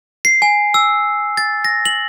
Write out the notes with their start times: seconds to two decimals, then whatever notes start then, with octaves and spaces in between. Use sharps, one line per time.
0.25 C7
0.42 G#5
0.74 E6
1.37 A6
1.65 A#6
1.85 F#7